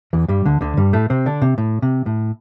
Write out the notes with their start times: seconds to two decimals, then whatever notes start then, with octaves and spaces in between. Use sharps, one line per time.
0.13 E2 E3
0.28 G2 G3
0.46 D2 D3
0.61 D2 D3
0.77 G2 G3
0.93 A2 A3
1.10 C3 C4
1.26 D3 D4
1.42 C3
1.58 A2
1.82 C3
2.06 A2